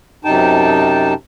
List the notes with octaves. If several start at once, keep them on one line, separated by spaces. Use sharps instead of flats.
F#2 C3 D#4 G5 A5